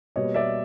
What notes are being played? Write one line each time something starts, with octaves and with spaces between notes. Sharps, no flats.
B2 G3 A#3 C#5 D#5
D5 E5